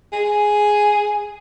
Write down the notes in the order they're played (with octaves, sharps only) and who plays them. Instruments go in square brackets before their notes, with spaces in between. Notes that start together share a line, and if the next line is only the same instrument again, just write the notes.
[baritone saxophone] G#4